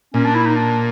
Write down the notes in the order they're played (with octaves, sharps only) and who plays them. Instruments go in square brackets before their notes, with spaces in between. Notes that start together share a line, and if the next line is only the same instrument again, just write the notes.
[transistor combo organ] A#2 [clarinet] C#4
[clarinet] D4
E4
D#4
D4